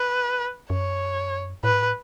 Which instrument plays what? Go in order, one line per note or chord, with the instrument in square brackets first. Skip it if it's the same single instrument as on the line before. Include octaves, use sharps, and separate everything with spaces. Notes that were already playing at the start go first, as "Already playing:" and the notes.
Already playing: [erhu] B4
[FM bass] F#2 [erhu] C#5
[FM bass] A2 [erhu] B4
[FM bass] G#2
A2